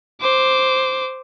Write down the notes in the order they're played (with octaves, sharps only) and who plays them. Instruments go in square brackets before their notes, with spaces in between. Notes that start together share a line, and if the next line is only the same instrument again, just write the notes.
[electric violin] C5 D6